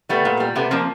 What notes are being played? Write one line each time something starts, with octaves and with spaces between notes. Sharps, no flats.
G3 A3 B3
A#2
G3
C3 A3 B3
F3 A#3 C4